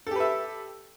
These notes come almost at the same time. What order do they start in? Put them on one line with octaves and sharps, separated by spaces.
A4 G4 B4 E5